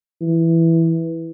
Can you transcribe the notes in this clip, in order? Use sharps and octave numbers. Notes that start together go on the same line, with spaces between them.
E3